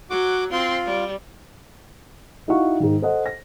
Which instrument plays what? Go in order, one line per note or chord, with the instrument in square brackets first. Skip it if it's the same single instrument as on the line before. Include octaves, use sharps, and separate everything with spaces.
[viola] F#3 [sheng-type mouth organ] F#4 D6
[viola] C4 C6 [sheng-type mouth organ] F4
[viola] G3
[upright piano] D#4 E4 F#4 F5 F#5 C#6
G#2 D#3
A4 C5 D#5 F#5
A#6